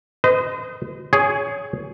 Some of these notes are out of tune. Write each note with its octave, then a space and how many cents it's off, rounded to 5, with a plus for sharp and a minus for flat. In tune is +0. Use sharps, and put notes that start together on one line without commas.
C5 -45 D#5 +0
G#4 +0 C#5 +20